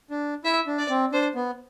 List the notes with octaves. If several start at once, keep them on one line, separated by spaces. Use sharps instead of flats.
D4
E4 E5
D4
D5
C4
D4 C5
B3